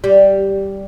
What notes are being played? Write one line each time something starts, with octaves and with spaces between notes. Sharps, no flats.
G3